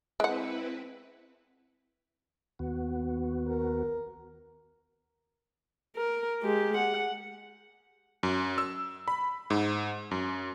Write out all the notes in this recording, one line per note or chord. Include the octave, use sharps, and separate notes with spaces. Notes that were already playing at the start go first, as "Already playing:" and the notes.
G#3 C4 E4 B4 F#5
D#2 B3 F#4
A#4
A#4
G#3 G4
F#5
F#2
E6
B5
G#2
F#2